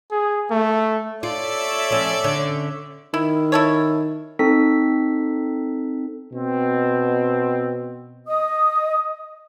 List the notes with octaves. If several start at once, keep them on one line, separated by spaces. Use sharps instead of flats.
G#4
A3
F4 A4 C#5 D5 E5
F3 C#4
D3 C#4
D#3 E4
E4 A4 C#5
C4 D#4 A4 B6
B2 C4
D#5 D#6